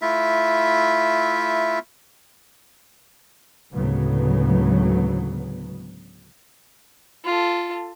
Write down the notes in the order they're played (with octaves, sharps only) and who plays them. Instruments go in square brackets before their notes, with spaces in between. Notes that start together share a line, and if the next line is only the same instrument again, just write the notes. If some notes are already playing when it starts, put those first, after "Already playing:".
[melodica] A3 E4 F4 E5
[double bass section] D2 A2 C#3 F#3 G#3 B3
[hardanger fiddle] F4 A4